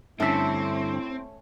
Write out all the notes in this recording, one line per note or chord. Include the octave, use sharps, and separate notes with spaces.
G2 D3 A3 C4 C#4 E4 E5